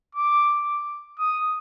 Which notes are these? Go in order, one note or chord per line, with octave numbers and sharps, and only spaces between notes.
D6
D#6